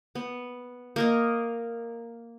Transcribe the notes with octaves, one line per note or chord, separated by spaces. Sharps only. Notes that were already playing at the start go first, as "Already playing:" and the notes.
B3
A#3 A#4 D#5